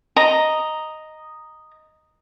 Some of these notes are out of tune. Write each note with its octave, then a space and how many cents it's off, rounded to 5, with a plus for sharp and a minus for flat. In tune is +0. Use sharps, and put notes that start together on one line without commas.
D#5 +0 A#5 +0